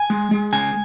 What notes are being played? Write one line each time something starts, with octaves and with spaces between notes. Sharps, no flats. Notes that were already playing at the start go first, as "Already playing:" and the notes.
Already playing: G#5
G#3
G#3
C#3 G#5